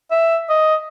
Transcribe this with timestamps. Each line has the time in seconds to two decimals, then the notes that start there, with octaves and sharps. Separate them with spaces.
0.11 E5
0.49 D#5